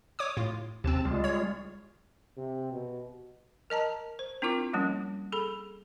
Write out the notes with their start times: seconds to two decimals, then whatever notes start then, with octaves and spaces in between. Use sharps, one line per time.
0.19 C#5 D6 D#6
0.37 A2 F4
0.84 D#2 C3 C4 A5
1.05 C#2 G3 G#3 F4
1.24 C#5
2.37 C3
2.72 B2
3.70 A#4 D#5 A5 A#5
4.19 C5
4.42 C4 D4 E4 F4 A#4 D6
4.73 F3 G3 A#3 C#4
5.32 G#4 A4 B5